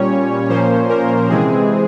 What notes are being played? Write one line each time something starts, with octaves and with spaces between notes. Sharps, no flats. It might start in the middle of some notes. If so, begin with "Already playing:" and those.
Already playing: A#2 G3 C#4 C#5
A#2 F3 A#3 C#4 C5
A#4
C3 E3 G#3 C4 G#4